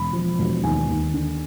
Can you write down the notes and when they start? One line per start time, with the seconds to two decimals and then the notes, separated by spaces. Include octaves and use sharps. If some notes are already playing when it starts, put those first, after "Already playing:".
Already playing: E1 B5
0.13 F3
0.39 E1
0.63 D#2 G#5
0.88 D#2
1.13 D3